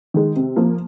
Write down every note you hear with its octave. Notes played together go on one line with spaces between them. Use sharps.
D#3 G#3
C3
F3 A#3